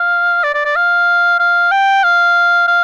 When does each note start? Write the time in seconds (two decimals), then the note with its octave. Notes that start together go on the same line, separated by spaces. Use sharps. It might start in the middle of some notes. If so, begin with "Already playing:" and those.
Already playing: F5
0.43 D5
0.54 D5
0.65 D5
0.76 F5
1.39 F5
1.72 G5
2.04 F5
2.68 F5